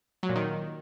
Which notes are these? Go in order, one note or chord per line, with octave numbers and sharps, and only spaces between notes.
F#3
A#2
D#3